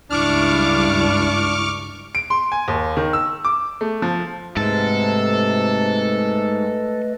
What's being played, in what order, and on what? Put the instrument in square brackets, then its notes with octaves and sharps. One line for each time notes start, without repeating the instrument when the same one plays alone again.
[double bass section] C#2 G2 [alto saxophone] D4 [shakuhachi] E4 [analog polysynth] C#6 D6 F6
[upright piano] D7
C6
G#5
D#2
D#3
E6
D6
A3
F3
[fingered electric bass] G#2 [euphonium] C3 [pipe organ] A3 B4 D#5 [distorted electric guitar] A4